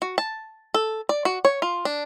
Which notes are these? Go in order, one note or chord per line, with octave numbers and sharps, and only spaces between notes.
F#4
A5
A4
D5
F#4
C#5
F4
D4